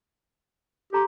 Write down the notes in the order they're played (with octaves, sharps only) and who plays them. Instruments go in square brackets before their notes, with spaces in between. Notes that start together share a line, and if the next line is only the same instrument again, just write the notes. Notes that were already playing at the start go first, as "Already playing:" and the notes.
[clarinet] G4 [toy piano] A4 A#5 C6